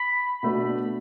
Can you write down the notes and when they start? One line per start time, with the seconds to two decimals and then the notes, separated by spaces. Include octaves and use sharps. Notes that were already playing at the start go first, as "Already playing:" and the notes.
Already playing: B5
0.43 B2 A3 D4